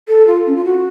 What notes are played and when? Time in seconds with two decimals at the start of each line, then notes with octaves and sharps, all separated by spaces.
0.08 A4
0.27 F4
0.47 C#4
0.56 F4
0.65 F#4